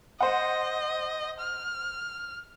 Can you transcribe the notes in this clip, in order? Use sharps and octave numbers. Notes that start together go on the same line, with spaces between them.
C5 D#5 F#5
F6